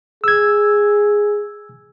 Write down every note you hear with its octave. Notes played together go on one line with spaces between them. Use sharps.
G#4 E6 G#6